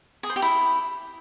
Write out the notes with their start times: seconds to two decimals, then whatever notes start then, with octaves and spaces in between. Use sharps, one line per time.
0.23 G#4
0.30 C5
0.36 G4
0.42 E4